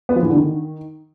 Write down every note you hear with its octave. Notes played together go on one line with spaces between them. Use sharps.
B3
F3
E3
D3
D#3